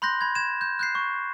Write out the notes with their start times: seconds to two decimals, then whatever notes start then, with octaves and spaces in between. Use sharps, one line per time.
0.02 B5 C6 F#6 G6 A#6
0.21 B5 G#6
0.35 G#6 E7
0.61 G6
0.79 F#6 G6 C7
0.95 C#6